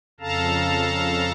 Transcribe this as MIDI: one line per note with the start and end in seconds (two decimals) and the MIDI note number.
0.20 1.32 41
0.20 1.32 49
0.20 1.32 69
0.20 1.32 77
0.20 1.32 81
0.20 1.32 82